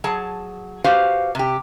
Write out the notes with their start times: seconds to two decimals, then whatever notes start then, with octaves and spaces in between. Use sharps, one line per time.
0.04 F#3 G#4 A5
0.84 F#4 G4 B4 C5 F5
1.35 C3 G4